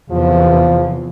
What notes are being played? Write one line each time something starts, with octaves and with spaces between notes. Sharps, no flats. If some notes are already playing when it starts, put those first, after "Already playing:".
E2 C3 E3 F3